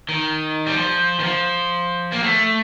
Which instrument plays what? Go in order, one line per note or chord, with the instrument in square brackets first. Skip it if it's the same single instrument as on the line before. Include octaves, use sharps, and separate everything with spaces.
[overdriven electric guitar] D#3
G3
F3
D#3
F3
A#3
A3